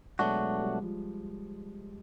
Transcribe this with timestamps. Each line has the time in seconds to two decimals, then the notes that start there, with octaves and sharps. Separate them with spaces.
0.19 B2 F#3 G#3 A3 D4 F#4
0.40 G#3
0.62 G3
0.82 F3